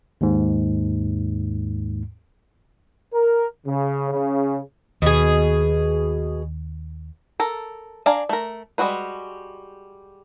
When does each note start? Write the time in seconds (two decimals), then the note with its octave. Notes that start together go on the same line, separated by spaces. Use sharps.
0.21 D#2 G#2
3.14 A#4
3.66 C#3
4.11 C#3
5.02 D#2 B2 G#4
7.40 A4 A#4
8.06 D4 D5 F5 G#5 A#5
8.29 A3 A#4
8.78 G3 G#3 F4 F#4 B4